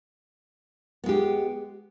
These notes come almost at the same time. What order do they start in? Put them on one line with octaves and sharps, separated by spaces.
B3 G#3 G4